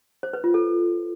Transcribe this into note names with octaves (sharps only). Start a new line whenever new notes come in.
C5
B4
F4
A4